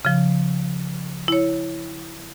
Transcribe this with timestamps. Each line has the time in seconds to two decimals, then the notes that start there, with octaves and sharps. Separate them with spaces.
0.05 C#3 F3
1.28 E4 C#5